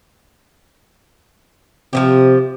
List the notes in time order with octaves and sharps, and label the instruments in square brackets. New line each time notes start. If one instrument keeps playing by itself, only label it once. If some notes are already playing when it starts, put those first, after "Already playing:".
[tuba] C3 [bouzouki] F3 F#3 G4